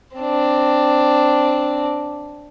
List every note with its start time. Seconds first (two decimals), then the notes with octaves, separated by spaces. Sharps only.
0.16 C4 D4